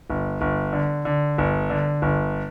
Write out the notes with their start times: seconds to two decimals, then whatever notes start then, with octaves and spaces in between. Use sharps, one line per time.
0.10 G1
0.41 G1
0.73 D3
1.05 D3
1.38 G1
1.70 D3
2.02 G1